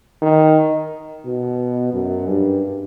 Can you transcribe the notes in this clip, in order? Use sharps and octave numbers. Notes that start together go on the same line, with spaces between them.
D#3
B2
F#2
G2